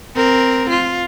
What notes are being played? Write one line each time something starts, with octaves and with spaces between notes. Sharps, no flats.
C4 A#4
F4